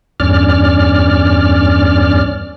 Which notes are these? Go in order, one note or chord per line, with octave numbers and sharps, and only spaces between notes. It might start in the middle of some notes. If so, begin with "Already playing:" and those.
E2 G2 C#4 D5 F6